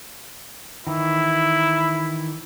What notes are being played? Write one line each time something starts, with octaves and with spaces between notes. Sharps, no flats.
D#3 E3 E4